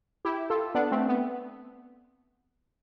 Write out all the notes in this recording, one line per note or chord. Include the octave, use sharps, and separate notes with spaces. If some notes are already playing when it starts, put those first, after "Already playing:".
E4 G4
F4 A4
B3 D4
A3 C4
B3